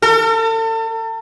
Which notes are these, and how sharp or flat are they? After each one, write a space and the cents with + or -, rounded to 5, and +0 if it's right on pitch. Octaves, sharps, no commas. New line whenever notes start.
A4 +40